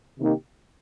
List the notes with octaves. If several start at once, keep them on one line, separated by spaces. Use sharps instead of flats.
C3 D#3 A#3 D#4 G4